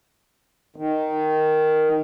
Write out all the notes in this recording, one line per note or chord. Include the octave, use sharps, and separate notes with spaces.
D#3